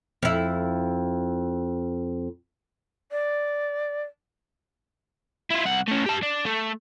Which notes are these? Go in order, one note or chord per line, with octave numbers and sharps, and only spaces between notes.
F2 E4
D5
E4 F4
C2 F#5
A3 C#4
G4 A5
D4
A3